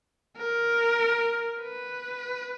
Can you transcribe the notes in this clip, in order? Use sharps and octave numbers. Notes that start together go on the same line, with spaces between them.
A#4
B4